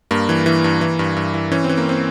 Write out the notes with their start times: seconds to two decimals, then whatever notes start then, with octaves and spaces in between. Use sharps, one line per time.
0.11 G2 A#3
0.29 E3
0.46 E3
0.64 G2
0.81 E3
0.99 G2
1.17 G2
1.34 E3
1.52 E3 C#4
1.64 C4
1.69 E3
1.78 A#3
1.89 C4